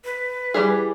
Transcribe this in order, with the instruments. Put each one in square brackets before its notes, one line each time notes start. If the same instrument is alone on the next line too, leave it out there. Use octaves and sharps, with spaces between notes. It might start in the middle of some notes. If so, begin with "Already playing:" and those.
[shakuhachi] B4
[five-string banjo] E3 G3 G#4